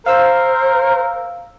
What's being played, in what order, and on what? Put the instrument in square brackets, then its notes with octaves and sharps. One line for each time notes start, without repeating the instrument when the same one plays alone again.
[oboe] A#4 [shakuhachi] C5 [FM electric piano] F5 E6